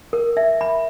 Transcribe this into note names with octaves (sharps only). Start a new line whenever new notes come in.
A#4
E5
B5